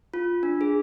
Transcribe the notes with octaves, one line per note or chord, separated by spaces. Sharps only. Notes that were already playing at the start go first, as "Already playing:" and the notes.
F4
D4
G#4